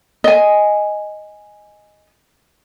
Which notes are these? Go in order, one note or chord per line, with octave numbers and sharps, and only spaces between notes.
D#5 G#5